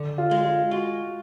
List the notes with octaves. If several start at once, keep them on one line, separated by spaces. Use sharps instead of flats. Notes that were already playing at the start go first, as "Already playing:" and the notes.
Already playing: D3
F4
G#3
F4
F4 F#4